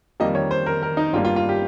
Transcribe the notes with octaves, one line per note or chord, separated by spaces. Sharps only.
F2 D#3 G3 A#3 D#5
C#5
C5
A#4
A#4
D#4
G1 G2 G3 A#3 F4
F4
F4
G4